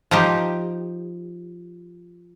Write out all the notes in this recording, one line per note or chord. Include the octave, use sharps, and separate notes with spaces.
F3 D#4 G4